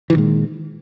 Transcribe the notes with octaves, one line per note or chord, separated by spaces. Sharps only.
A#2 D#3 E3 G#3